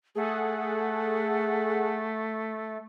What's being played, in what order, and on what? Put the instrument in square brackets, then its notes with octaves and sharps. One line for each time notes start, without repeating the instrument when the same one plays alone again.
[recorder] A3 [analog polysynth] G#4 A4 F#5